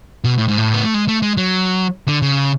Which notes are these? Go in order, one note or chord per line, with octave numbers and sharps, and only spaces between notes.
B2
A2
G#2
A2
B3
A3
G#3
A3
G#3
F#3
D3
C#3